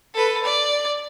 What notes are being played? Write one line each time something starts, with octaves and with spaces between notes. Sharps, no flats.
A4 B4
D5